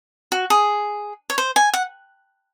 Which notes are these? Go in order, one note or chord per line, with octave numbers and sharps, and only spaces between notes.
F#4
G#4
C#5
C5
G#5
F#5